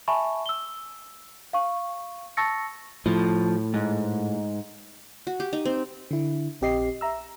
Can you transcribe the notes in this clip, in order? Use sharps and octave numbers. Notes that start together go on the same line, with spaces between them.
E5 G#5 A5 B5 C#6
E6 G7
F5 C#6
A5 C#6 E6 A6 A#6 C#7
A2 F3
G#2
F#4
G4
D#4
C4
D3 E4
A#1 C4 G4 D#5 C7
E5 A#5 E6